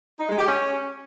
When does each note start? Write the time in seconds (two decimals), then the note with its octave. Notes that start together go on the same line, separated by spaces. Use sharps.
0.20 D#4
0.29 G#3
0.39 G4
0.48 C#4